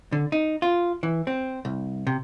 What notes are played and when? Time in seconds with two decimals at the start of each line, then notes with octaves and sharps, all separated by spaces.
0.12 D3
0.32 D#4
0.62 F4
1.03 E3
1.27 C4
1.65 C2
2.07 C3